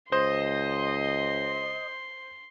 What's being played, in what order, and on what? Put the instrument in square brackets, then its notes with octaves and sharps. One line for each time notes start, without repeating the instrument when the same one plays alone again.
[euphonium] C#2 [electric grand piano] C5 [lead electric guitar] D#5 [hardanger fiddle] C6